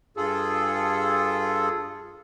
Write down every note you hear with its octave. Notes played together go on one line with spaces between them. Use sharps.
G2 F4 G#4 A4